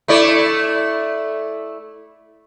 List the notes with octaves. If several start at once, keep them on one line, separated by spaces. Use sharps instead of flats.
A3 E4 D5